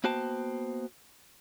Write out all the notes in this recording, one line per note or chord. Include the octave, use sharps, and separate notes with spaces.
A#3 B3 F#4 C5 G5 A5